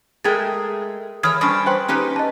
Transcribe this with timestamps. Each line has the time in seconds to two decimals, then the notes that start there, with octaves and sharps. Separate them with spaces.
0.24 G#3 A3 G#4 A#4 G5 G#6 A6
1.23 E3 C#5 D#6 F6 G#6
1.41 G3 C#4 D4 C5 C#6 D#6
1.66 B4 C5 G5 C6 F#6
1.88 C#4 D#4 G4 B4
2.16 D#5 A5